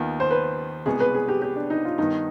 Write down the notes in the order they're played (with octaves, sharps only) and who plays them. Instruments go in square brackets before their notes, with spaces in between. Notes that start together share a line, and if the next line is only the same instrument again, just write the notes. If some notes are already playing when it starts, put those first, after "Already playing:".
Already playing: [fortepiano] D#2 D#3 B3 F4
[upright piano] C5
B4
[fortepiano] C2 B2 G#3 B3 [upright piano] G#4
[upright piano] B4
G#4
G4
G4
D4
D#4
F4
[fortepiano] G2 D#3 B3 [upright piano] D#4